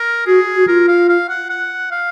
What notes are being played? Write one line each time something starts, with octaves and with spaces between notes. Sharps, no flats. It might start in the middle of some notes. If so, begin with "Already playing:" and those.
Already playing: A#4
F#4 G#4
F#4
F4 A#4
F5
F5
F#5
F#5
F5